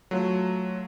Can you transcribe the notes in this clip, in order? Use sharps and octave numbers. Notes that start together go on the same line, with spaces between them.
F#3 A3 F4